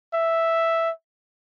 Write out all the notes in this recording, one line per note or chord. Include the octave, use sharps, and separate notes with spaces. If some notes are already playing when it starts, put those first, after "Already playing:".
E5